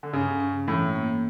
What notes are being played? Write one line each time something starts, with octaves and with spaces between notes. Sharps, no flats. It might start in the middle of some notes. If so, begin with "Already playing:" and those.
D3
G2 C#3
C#4
A2 E3
A#3